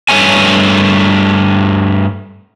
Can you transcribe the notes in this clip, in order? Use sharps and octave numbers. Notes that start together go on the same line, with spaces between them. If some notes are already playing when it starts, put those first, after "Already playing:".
G2 A3 C#5 G#5